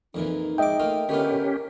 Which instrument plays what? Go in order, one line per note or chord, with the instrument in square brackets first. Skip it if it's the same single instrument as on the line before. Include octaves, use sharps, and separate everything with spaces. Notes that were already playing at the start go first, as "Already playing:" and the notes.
[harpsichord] F2 A#2 E3 [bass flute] D#4
[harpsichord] G#2 D6 [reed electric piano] D#5 E5 G5
[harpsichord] A3 A#3 F4
[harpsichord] D3 B3 F4 [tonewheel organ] C#4 G4 [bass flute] A#4